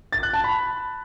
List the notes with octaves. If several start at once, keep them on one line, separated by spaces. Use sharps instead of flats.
A6
F#6
A5
B5